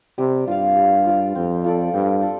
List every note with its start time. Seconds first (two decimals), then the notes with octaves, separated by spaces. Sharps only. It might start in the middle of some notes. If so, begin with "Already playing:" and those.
0.18 C3 G3
0.47 G2 F4 D5 F5
0.77 G3
1.06 F4 D5 F5
1.35 F2 C4
1.64 F4 A4 D5
1.93 G2 C4
2.22 F4 A4 D5